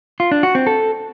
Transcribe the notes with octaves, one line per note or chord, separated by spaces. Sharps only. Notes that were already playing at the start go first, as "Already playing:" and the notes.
F4
D4
F#4
C4
A4